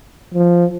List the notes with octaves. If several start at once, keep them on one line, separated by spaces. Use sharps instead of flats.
F3